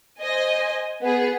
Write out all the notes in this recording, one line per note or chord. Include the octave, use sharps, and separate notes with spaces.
C5 D#5 G#5
B3 G#4